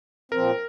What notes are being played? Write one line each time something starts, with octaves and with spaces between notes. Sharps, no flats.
A#2 F3 C4 A#4